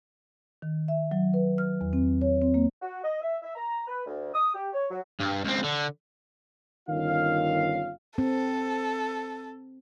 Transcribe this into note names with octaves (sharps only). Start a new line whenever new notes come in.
D#3
E5
F#3
B4
F6
E2
C4
C#5
C4
A#3
F#4
D#5
E5
E5
A#5
B4
D2
D#6
G4
C#5
F#3
G2
C#2 C4
D3
G1 D#3 C#4 F4 F5
C4 A4